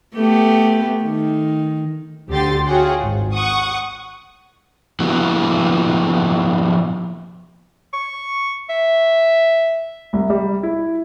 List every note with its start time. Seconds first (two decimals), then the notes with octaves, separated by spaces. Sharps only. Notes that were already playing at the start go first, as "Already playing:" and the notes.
0.15 A3 B3 G4
1.03 D#3
2.30 D2 D3 G4 G5 C6 A6
2.66 F4 F#4 G#4 C#5 F#5 G5
3.01 G#1
3.34 F#5 C#6 D#6
5.00 F3 A#3 B3 E4 F#4
7.93 C#6
8.69 E5
10.13 C2
10.30 G3
10.63 E4